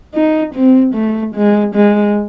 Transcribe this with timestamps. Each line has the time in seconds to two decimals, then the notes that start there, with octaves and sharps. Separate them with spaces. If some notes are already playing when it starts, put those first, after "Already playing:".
0.14 D#4
0.54 C4
0.95 A3
1.35 G#3
1.75 G#3